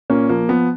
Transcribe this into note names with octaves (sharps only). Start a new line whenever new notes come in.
A#2 A#3 C#4
F3 A#3
F3 B3